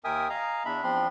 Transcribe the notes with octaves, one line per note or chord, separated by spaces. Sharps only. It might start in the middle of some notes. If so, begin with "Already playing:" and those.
D#2 A#4 E5 G5 G#5 D#6
D#5 F5 G#5 A#5
E2 D4 E5 B5
E2 F3 C4 D4 B5 C6